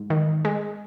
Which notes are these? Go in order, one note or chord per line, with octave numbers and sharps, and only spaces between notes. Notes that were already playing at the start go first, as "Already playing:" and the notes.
Already playing: G#2
D#3
G#3